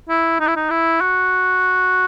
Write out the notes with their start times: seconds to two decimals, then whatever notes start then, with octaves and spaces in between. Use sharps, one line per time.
0.09 E4
0.40 D#4
0.48 E4
0.56 D#4
0.70 E4
1.01 F#4